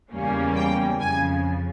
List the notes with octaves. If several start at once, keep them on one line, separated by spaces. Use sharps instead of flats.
E2 C#3 G3 A#3 C#4
G5
F2 C#3 F3 G#5